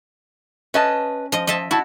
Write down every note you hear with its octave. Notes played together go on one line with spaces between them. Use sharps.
C#4 B4 D#5 A5
F3 D#5
F3 D#5 E5 A5
E4 F#4 A5